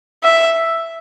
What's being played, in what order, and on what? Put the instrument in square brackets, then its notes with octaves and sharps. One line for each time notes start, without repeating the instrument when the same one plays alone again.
[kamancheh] E5